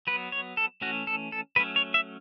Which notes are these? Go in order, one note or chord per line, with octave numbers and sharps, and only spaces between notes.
F#3 B3 B4
C#5
A4
E3 A3 C#4 F#4
A4
A4
F#3 A3 C#4 B4
C#5
E5